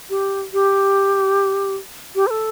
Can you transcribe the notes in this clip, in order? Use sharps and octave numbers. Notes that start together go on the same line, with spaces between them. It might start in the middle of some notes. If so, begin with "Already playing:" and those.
G4
G4
G4
C5
A4